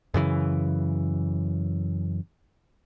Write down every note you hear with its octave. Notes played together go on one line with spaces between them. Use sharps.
F#2 C#3 E3